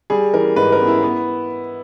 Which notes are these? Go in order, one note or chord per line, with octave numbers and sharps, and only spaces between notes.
G3 G#4
E3 A#4
G#2 B4
A#4
B3
E4
B3